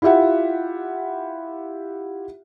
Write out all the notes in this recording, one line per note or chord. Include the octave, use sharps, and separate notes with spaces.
E4 F4 G4 E5 F#5